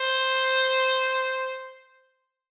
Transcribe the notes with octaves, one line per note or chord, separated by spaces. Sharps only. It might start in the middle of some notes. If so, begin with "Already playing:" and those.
Already playing: C5